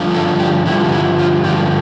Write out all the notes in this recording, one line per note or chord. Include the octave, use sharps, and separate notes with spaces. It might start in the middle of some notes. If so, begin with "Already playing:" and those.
Already playing: G2 D3 F3
A4
G4
G2 D3 F3 E4
E4
F4
G2 D3 F3 G4